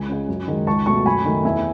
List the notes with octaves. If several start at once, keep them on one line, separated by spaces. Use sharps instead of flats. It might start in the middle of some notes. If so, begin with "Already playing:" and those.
Already playing: C#2 G#5
C#3 G#3
F#2
D#3 G#3
C#2 A5 C#6
B2 F#3 A3 A5 C#6
F#2 G#5 B5
D#3 A3
E2 E5 G#5